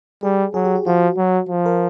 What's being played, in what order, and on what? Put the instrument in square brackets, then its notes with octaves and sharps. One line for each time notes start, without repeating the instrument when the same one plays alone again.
[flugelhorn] G3 [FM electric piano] G#4
[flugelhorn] F#3 [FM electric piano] G#4
[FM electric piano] G4
F#4
[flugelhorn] F3 [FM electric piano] F#4
[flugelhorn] F#3
F3
[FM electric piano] A#4